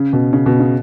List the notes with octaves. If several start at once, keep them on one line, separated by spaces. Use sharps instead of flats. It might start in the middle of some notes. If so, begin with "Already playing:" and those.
Already playing: C#3
B2
C#3
B2
C#3